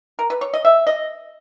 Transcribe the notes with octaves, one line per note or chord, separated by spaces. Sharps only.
A#4
B4
C#5
D#5
E5
D#5